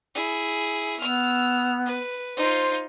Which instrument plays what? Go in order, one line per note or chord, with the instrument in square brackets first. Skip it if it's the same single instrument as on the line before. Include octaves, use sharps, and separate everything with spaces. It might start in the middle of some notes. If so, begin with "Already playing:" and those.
[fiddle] E4 G#4
[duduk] B3 [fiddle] E6 F6
[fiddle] B4
[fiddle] D#4 F4 [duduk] C5